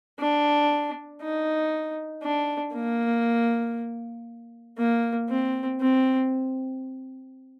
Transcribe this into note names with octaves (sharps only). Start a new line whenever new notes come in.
D4
D#4
D4
A#3
A#3
C4
C4